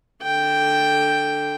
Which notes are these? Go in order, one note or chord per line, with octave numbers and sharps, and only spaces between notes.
D3 G5